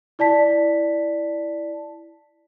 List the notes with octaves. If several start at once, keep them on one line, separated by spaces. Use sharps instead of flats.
E4 D5 A5 B6